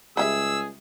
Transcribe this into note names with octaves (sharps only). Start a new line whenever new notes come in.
C#2 G3 G4 G#4 E5 E6